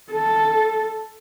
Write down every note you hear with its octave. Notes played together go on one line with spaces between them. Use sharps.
A4